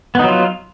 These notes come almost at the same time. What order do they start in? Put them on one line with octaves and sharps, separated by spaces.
B3 D#4 F#3 F4